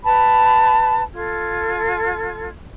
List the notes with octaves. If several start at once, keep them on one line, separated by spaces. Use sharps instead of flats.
B4 A5 B5
F4 A4 F6 G#6